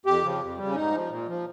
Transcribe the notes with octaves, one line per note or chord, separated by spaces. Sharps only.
F2 G4
C#3 F3
F2
C#3 G3
C#4
G#2 D#4
F3
A#2
F3